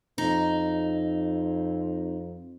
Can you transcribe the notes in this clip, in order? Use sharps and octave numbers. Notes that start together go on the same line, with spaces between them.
F2 D#4